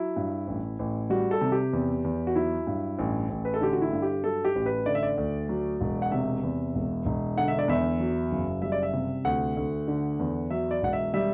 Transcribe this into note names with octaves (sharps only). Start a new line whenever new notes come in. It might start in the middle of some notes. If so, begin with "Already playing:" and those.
Already playing: F#3 E4
G2
A1
A1
G3 F#4
A4
C3
G4
E2
E2
F#4
F#3 E4
G2
A1
A1
B4
A4
D3 G4
F#4
E4
G2
G4
F#3 A4
G4
A1
B4
D3 D5
E5
D5
D2
F#3
E1
F#5
C3 E5
E2
E1
E1
D3 F#5
E5
D5
E2 E5
F#3
F#1
G3 E5
D5
E5
C3
D2 F#5
D2
D3
E2
F#3 E5
D5
E1 F#5
E5
G3 E5